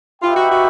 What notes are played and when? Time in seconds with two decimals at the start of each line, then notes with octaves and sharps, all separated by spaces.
0.22 D#4 F4 G4 B4 E5 G5
0.36 F#4
0.50 F#4